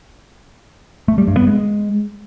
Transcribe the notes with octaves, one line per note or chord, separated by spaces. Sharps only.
A3
G3
G2
B3
G#3